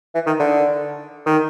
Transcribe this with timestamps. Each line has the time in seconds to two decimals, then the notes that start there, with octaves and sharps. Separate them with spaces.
0.15 E3
0.26 D#3
0.39 D3
1.26 D#3